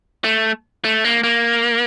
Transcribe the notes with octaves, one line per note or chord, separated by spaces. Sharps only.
A3
A3
A#3
A#3